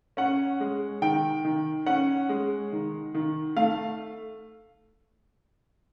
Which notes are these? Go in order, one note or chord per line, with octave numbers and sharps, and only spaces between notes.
C#4 F#5
G#3
D#3 G5
D#3
C#4 F#5
G#3
D#3
D#3
A3 F5